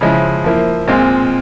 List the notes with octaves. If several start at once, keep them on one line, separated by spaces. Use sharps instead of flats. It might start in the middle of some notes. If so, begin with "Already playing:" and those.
C#3 F3 G#3 E4
F3 A#3 E4
A#2 G#3 C4 F4